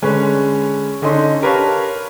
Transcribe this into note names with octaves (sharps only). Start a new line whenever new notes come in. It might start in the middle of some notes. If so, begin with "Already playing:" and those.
D3 G#3 C#4 B4 C#5
D3 C#4 D#4 C6
G4 A#4 B4 C#5 F5 A5